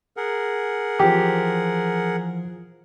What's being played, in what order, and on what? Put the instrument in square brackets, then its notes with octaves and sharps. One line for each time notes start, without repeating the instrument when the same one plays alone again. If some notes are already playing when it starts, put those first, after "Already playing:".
[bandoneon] G#4 A#4 F#5
[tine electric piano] E3 F3 [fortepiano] G4